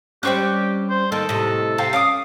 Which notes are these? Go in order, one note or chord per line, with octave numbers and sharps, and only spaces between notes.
G3 C4 C#4 G4 G5 C#6 F#6
C5
D#3 A#3 A4
A2 C3 D#5
C3 F5 G5 A5
C#4 F5 D6 D#6